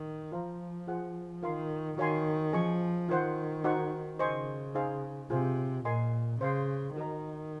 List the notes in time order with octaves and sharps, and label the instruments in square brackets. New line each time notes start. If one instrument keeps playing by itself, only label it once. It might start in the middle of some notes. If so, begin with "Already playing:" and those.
Already playing: [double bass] D#3
[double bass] F3 [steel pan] F4 C5 F5 A#5
[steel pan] F4 G#4 C5 F#5
[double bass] D#3 [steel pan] F4 A#4 F5 C6
[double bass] D#3 [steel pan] F#4 C#5 F5 G#5 C6
[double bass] F3 [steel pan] C#4 G#4 D#5 G#5 C#6
[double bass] D#3 [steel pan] F4 C5 F#5
[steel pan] D#4 F#4 C5 F#5 C#6
[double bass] C#3 [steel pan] C5 D#5 G#5 C#6
[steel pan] D#4 G#4 C5 F5
[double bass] C3 [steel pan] F4 G#4 C5 F5
[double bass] A#2 [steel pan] A#4 D#5 G#5 C6
[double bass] C#3 [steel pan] C5 F5 C6
[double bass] D#3 [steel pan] F#4 A#4 D#5 A#5